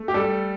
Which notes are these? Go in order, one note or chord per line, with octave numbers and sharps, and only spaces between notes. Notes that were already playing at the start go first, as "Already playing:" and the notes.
Already playing: A3
G4
G3 A4